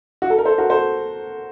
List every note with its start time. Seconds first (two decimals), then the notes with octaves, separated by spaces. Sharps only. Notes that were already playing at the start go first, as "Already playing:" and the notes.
0.22 F#4
0.30 A4
0.38 A#4
0.45 A4 C5
0.58 F#4 A#4
0.70 A4 C5